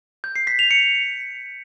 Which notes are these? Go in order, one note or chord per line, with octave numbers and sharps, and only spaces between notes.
G6
C7
B6
F7
C#7